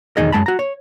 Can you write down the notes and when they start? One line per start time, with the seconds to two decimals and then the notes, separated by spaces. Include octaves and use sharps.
0.17 B1 E2 D#3 D#4 G#4 D#5
0.32 F#2 G#3 A5 B5
0.46 F#4 A#5
0.59 C#5